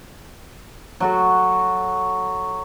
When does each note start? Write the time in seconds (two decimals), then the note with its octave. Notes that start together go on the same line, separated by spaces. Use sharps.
1.00 F#3 F#4 A4